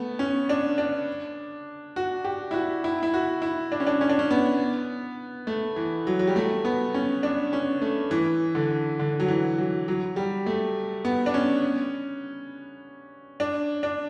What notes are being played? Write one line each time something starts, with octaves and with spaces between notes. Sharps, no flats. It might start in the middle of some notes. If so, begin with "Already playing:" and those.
Already playing: A3 B3
C#4
D4
D4
F#4
G4
E4
F#4
E4
E4
F#4
E4
D4
C#4
D4
C#4
D4
C#4
B3
A3
E3
F#3
F#3
G3
A3
B3
C#4
D4
C#4
A3
E3
D3
D3
F#3
E3
F#3
F#3
G3
A3
B3
D4
C#4
D4
D4